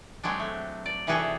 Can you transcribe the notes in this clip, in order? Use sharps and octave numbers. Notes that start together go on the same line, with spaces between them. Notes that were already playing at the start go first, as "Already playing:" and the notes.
F#3 G#3 C4 D4
A3
D5
C3 E3 G3 F#4 G#4 A4